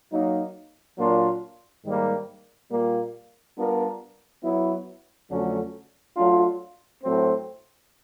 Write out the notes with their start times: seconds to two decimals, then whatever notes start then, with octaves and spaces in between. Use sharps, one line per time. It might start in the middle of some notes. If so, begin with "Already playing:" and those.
0.12 F#3 A#3 D#4
0.97 A#2 F#3 A#3 D4 F4
1.84 G#2 D#3 G3 A#3
2.71 A#2 G3 A#3
3.57 G3 B3 D4 F4 A#4
4.43 F#3 B3 E4
5.30 F2 D3 F#3 A3 C#4
6.15 F#3 A3 D4 F4
7.02 A2 F#3 A3 C4